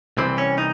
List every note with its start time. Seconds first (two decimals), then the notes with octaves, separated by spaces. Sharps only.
0.17 C2 C3 E3 C4
0.38 C#4
0.58 D#4